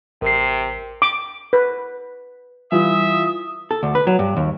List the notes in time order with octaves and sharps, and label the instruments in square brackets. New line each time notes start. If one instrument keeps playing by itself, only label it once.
[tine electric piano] A1 C7 [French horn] C3 [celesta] A#4
[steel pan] D6
B4
[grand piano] E3 [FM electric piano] G3 F4 [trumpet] E5 [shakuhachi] D#6
[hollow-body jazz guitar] A4
D2
B4
F#3
G2
D#2